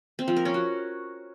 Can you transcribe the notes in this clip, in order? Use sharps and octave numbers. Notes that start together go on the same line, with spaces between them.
C4
F3
A#4
C#4
F#4